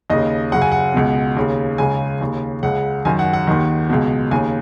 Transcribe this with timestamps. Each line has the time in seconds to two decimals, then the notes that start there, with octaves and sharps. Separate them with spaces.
0.10 D#2 C#3 D#5
0.52 F#2 C#3 F#5
0.62 G#5
0.72 F#5
0.94 C#2 B2
1.37 D#2 C#3
1.78 C#2 C#3 G#5
2.21 D#2 C#3
2.63 C#2 C#3 F#5
3.05 F#2 D#3 G#5
3.19 F#5
3.33 F#5
3.47 D#2 D#3
3.90 C#2 B2
4.31 D#2 C#3 G#5